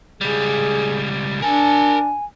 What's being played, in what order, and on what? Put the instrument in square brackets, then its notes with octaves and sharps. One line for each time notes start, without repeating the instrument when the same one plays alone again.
[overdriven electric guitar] C#2 G3 [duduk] G#4
[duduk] D4 [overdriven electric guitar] A#4 A5 [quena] G#5